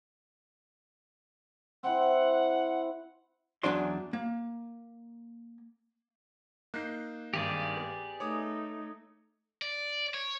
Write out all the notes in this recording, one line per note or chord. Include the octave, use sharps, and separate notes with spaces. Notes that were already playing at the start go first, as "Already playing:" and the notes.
C4 E4 F#5
E2 F#3 C#4 D4 D5 C6
A#3
A#3 D#4 F#6 G6 C7
G#1 G2 D#3 G4 G#4 D5
B3
A3 D#4 C#5 D6 D#6
D5
C#5